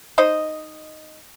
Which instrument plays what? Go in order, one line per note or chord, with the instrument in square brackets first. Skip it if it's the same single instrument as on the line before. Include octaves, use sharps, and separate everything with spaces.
[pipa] D#4 C5 D#5